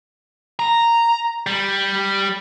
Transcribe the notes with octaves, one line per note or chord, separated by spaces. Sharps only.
A#5
G3